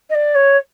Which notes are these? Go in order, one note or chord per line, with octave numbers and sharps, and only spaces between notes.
D#5
D5
C#5